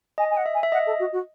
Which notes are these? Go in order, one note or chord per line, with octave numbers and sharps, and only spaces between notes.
D#5 G#5
G#5
F#5
E5
G#5
E5
D#5 F#5
A4
F#4
F#4